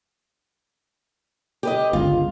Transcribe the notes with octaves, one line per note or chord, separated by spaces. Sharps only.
G4 B4 D#5
G1 C#2 F4